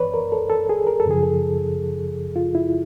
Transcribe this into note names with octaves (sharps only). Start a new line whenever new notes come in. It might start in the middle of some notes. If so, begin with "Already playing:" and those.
Already playing: G2 E3 B4 C#5 D5
A#4
A4
A4
G#4
A#4
A4
F#2 C#3 F3 G#4
A4
F4
E4